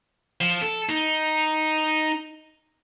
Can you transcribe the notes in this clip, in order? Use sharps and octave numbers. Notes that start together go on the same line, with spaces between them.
F3
A4
D#4